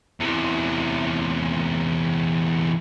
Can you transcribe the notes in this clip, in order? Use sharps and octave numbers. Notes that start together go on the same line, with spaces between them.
E2 C3